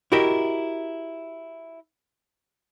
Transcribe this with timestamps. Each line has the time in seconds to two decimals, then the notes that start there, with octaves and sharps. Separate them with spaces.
0.12 E4 F#4 G4 A#4 D#5 E5